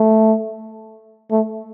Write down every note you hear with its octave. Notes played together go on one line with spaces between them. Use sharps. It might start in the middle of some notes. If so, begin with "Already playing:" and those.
Already playing: A3
A3